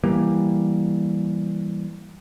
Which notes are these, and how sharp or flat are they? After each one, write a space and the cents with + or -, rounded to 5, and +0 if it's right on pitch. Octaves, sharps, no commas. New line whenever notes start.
E3 +0 G3 +0 A#3 +15